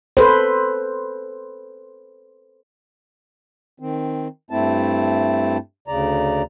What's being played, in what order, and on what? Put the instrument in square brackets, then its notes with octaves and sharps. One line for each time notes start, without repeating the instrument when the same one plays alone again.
[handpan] A4 B4 C5
[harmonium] D#3 C4
G2 A3 C4 E4 A5
D2 C#3 D5 A#5